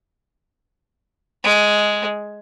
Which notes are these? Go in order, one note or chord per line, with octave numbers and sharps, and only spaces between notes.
G#3